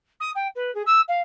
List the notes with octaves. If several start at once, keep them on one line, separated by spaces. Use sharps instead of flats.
D#6
G5
B4
G#4
E6
F5